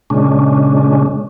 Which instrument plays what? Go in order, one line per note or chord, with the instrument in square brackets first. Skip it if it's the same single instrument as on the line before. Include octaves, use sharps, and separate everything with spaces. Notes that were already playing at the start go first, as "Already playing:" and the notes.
[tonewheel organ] A#2 C#3 G#3 C#4 D4